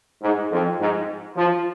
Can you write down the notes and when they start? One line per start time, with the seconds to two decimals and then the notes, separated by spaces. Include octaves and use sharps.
0.22 G#2
0.51 F2
0.79 G#2
1.36 F3